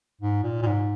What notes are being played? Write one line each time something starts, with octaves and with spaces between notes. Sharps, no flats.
G#2
A#2
A#2
G#2